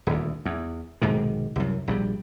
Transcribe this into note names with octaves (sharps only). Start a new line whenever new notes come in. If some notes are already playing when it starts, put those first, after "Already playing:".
D#1 D2
E2
B1 G#2 C3 D#3
C2 F#2
A#1 F#3 G3